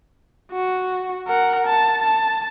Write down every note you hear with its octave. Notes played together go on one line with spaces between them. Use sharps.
F#4
A#4 F#5
A5
A5